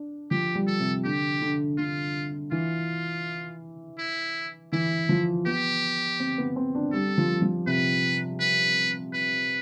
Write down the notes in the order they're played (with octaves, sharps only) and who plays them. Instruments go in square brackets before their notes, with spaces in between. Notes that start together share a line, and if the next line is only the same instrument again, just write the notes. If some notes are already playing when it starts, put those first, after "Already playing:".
Already playing: [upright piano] D4
[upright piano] F3 [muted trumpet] G4
[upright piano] G3
[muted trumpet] A4
[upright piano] C3
[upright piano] D3 [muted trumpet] G4
[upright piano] D3
[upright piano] D3 [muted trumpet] F4
[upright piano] E3 [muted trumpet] F4
[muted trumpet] E4
[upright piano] E3 [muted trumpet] E4
[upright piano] F3
[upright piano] B3 [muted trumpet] G4
[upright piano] C4
B3
C4
D4
[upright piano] G3 [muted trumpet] A4
[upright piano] F3
F3
[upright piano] C3 [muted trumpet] B4
[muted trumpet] B4
B4